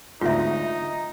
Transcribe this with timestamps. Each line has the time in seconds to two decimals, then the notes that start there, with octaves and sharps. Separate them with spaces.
0.21 D2 G#2 D#4 F4 E5